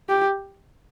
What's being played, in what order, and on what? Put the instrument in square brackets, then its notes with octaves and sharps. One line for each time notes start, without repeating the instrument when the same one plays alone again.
[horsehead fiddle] G4